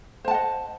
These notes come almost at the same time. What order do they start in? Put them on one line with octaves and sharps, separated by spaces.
C5 A5 F#5 D#5